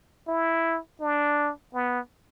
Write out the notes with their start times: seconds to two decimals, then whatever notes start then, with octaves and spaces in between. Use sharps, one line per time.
0.28 E4
1.01 D4
1.74 B3